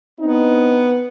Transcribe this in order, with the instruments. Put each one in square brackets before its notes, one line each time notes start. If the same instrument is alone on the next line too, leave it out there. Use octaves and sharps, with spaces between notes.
[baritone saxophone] B3 [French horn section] C4 D4 D#4